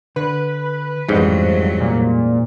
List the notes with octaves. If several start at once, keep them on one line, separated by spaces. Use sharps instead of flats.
D3 B4
A1 F2 G#2 F#3 G3 C5
A#2